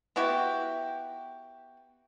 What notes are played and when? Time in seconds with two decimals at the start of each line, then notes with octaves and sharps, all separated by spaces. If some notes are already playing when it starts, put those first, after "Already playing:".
0.16 B3 E4 F#4 G4